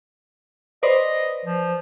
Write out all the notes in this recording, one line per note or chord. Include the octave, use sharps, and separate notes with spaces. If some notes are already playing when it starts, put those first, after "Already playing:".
B4 C5 D5 D#5
F3